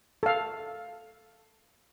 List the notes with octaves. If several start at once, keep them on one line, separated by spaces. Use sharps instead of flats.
A4 F5